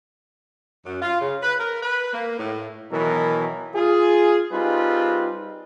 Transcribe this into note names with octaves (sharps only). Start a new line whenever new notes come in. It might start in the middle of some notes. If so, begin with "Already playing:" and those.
F#2
F4
C#3
B4
A#4
B4
A#3
A2
B2 D#3 E3 F#3 A#4
F4 G#4
G3 C4 D#4 F4 G#4 B4